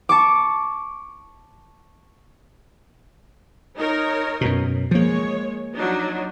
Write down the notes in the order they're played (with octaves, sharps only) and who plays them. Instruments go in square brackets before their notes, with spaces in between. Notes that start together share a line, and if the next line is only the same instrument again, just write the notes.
[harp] A5 C#6 D6
[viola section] D#4 A#4 C#5
[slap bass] F#2 B2
[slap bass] F3 A#3 [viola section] G#3 C#5
[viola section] F#3 D4 D#4